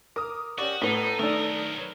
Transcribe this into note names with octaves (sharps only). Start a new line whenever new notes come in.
A#4 D6 D#6
C#4 F#4 G4 D5 D#6
A2 B3 D#4 A4 B4 D#6
B1 D#3 A3 D4 A#4
B4 C#6